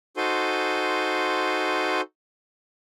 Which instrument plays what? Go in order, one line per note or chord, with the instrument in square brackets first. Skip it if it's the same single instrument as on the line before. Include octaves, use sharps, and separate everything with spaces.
[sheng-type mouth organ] D#4 F#4 A4 C5 G#5 C6